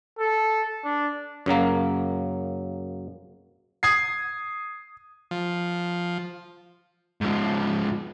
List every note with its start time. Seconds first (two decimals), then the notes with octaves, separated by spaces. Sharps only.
0.20 A4
0.85 D4
1.46 F#2 C#3 F#3 A#3
3.83 D#6 G#6 C7
5.31 F3
7.21 G#2 F3